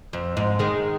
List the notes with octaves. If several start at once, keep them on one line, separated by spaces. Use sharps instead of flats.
F2
G#2
D#3 G#3